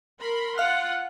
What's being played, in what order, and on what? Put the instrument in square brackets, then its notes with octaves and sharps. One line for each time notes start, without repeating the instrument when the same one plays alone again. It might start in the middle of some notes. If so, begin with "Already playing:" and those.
[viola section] A#4 B5 C6
[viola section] F4 F#5 [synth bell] F5 F6